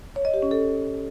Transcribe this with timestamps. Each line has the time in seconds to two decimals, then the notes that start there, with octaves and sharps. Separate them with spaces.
0.16 C#5
0.25 D#5
0.34 G4
0.43 C#4
0.51 A4